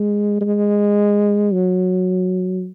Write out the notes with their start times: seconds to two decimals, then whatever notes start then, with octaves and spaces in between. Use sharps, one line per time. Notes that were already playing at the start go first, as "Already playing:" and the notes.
Already playing: G#3
0.41 G#3
1.53 F#3